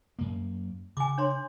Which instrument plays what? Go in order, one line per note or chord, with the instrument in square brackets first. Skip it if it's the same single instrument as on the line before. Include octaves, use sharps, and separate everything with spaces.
[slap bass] F#2 A#3
[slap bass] C#3 [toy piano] G#5 D6
[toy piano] D4 C#5 C6